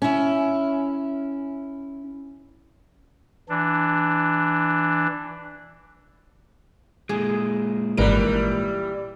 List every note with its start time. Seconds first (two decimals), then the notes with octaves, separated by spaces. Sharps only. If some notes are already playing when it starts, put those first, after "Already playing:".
0.02 C#4 E4
3.49 E3 D4
7.09 A#2 G#3 G#4
7.97 G#1 E3 G3 A#4 B4 D7